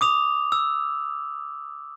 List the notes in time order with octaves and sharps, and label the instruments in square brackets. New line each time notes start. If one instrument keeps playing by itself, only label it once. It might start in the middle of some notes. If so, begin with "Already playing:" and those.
[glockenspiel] D6 D#6 F7
E6